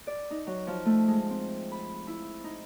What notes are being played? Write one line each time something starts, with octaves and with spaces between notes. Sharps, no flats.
D5
D#4
F#3
F3
A3
G#3
C4
B5
E4
D#4